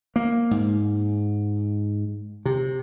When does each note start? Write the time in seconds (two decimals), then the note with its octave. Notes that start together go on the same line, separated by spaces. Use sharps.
0.16 A#3
0.51 G#2
2.45 C3